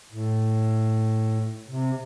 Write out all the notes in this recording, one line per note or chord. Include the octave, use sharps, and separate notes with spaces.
A2
C3